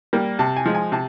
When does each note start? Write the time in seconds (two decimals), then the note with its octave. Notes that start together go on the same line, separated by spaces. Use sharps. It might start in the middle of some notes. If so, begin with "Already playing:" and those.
0.13 G3 A#3
0.39 C3 A5
0.57 G#5
0.66 F3 G#3
0.75 G#5
0.92 C3 A5